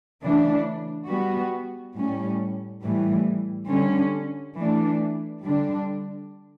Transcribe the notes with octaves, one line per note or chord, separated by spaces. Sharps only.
C#3 E3 A3 D4
G3 B3 F#4
A2 G3 C#4
A2 E3 G3
D3 G3 C#4
E3 A3 D4
D3 G3 D4